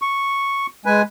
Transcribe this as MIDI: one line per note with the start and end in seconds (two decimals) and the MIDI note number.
0.02 0.67 85
0.86 1.02 56
0.86 1.02 71
0.86 1.02 80